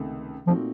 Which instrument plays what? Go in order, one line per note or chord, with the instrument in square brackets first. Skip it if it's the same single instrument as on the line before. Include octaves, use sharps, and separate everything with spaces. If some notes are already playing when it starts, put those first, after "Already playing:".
Already playing: [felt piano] C#2 C3 D#3 A3
[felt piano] A#2 A3 C4 D#4 F#4 [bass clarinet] F3